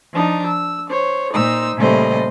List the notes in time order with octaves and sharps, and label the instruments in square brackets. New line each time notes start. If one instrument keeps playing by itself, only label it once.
[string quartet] F3 D4 D#4
E6
C5 C#5
A#2 D#4 C5 E6
A#2 C#3 G3 A3 C5 D#5